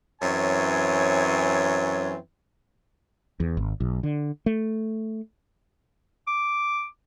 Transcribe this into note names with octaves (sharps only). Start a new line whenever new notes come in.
F#2 E3 C4 C#5 G#5
E2
G#1
B1
D3
A3
D6